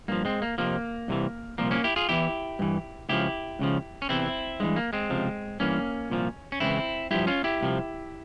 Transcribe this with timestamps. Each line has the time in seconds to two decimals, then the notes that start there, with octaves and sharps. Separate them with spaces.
0.08 G2 F3 A#3
0.25 G#3 C4
0.42 A#3
0.58 F2 C3 F3 A#3
1.08 C2 C3 E3
1.58 C2 A#2 F3 A#3
1.71 A#3 C#4
1.84 E4 G4
1.96 F4 G#4
2.09 E2 E3 E4 G4
2.59 G2 E3
3.09 C#2 C#3 F3 E4 G4
3.59 C#2 C#3 F3
4.02 C#4
4.09 E2 C3 E3 C4 E4
4.60 G2 E3 G#3
4.76 A#3
4.93 G#3 C4
5.10 C#2 C3 F3
5.60 G2 E3 A#3 C#4
6.10 C2 A#2 F3
6.52 C#4
6.60 C#2 C#3 E3 C4 E4
7.11 G2 F3 E4 G4
7.27 C#4 F4
7.44 E4 G4
7.61 C2 C3 F3